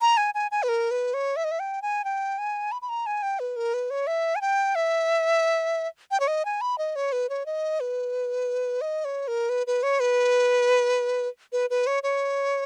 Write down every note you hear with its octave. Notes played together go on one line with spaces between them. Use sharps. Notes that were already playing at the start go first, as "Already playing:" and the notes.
A#5
G#5
G#5
G#5
B4
A#4
B4
C#5
E5
D#5
E5
G5
G#5
G5
G#5
B5
B5
A#5
G#5
G5
B4
A#4
B4
C#5
E5
G#5
G5
E5
G5
C#5
D#5
G#5
B5
D#5
C#5
B4
C#5
D#5
B4
D#5
C#5
A#4
B4
B4
C#5
B4
B4
B4
C#5
C#5